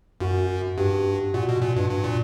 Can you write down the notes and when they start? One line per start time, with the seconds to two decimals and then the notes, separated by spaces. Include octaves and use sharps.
0.20 F#2 F#4
0.78 G2 G4
1.34 A#2 F#4
1.49 B2
1.62 A#2
1.76 G2
1.90 G2
2.04 A#2